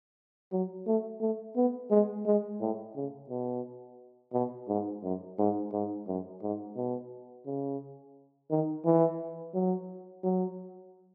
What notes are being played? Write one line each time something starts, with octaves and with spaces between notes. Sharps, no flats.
F#3
A3
A3
B3
G#3
G#3
A2
C#3
B2
B2
G#2
F#2
G#2
G#2
F#2
G#2
B2
C#3
D#3
E3
F#3
F#3